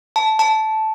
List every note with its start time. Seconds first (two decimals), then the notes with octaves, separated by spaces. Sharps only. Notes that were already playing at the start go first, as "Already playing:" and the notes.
0.16 A5
0.39 A5